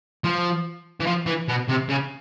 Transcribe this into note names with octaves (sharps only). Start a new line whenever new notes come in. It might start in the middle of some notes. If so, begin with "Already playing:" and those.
F3
E3
F3
E3
B2
C3
C#3